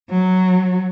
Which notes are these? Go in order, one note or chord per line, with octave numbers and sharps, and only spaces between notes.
F#3